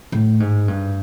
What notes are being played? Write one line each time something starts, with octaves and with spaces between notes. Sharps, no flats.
A2
G#2
G2